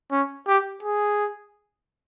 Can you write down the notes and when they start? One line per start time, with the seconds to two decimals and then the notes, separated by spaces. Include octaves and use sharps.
0.11 C#4
0.47 G4
0.83 G#4